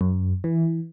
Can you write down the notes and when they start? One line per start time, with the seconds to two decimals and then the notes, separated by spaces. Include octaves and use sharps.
0.01 F#2
0.44 E3